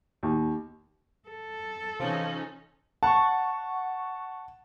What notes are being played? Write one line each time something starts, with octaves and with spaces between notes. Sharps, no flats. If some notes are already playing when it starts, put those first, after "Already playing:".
D#2
A4
C3 E3 F3 C#4 D#4
F#5 A5 C#6